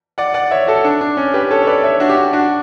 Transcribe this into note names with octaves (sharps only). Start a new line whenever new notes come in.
D5 F#5
D5 F#5
C#5 E5
F#4 A4
D4
D4
C#4
G4 B4
A4 C#5
C#5
B4 D5
C#5 E5
D4 F#4
G4
D4 F#4
D4 F#4